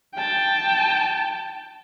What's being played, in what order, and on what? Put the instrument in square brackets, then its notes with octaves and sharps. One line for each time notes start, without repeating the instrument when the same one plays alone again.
[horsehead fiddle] G5 A5